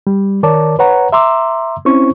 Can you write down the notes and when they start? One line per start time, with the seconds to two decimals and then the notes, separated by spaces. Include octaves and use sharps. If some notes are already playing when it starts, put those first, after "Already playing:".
0.07 G3
0.43 D#3 A#4 C#5 D5 A5 D6
0.79 B4 C#5 F#5 A#5
1.12 E5 A#5 C6 D6 E6
1.85 C4 C#4 E4 C5 C#6